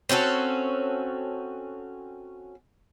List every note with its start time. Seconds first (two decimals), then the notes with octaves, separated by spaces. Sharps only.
0.09 C4 C#4 F#4 A4